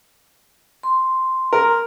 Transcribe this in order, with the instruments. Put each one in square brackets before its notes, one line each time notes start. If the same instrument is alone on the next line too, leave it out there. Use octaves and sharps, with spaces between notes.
[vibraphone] C6
[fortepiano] A#4